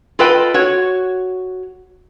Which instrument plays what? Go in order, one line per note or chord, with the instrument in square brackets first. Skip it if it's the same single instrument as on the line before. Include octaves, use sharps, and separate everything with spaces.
[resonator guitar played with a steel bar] F4 A4 B4 D#5 G5
F#4 C#5